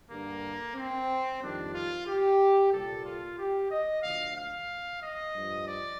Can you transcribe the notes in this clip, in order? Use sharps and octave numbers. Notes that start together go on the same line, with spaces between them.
G2 D3 G3 A#3
C4
F2 D#3 G3 D4
F4
G4
C2 A#2 G3 A4
F4
G4
D#5
D2 D3 F3 F5
F5
D#5
G2 F3
D5